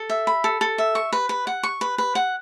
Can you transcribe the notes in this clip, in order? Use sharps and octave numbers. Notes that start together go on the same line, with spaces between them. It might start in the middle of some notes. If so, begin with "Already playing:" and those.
Already playing: A4
E5
B5
A4
A4
E5
C#6
B4
B4
F#5
C#6
B4
B4
F#5